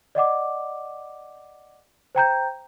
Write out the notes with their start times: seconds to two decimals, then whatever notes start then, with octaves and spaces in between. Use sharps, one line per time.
0.15 D5 D#5 F#5 D6
2.15 C5 G5 A#5 G6